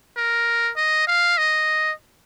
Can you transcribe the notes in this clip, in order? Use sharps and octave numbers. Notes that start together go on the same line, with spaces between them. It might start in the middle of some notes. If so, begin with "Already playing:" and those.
A#4
D#5
F5
D#5